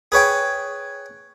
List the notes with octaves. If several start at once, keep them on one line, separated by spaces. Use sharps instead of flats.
G#4 B4 C#5 G5